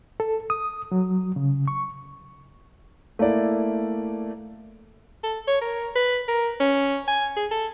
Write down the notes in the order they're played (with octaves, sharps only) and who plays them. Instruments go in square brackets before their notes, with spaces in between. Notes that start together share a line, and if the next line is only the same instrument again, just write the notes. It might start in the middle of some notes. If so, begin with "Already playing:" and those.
[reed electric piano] A4
D#6
F#3
C#3
C#6
[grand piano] A3 A#3 E4 D5
[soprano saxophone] A4
C#5
A#4
B4
A#4
C#4
G#5
G#4
A4